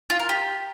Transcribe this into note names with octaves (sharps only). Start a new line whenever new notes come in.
F4
A#4
G4